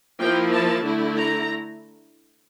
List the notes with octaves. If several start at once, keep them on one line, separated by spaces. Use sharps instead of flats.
F3 A#3 E4 G5
A5
D3 A3 E4
A#5